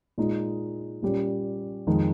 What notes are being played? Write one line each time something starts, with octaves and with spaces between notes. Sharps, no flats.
A#2 G#3 D#4
A#2 G3 C#4 G4
F2 D#3 G#3 D#4